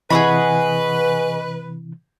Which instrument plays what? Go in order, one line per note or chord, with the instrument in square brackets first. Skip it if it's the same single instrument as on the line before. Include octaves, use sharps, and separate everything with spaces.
[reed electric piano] C3 E3 [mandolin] G#4 F#5 B5 [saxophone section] B4 [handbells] D#5 C#6